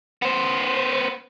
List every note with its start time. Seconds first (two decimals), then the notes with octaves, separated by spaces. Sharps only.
0.22 B3 C5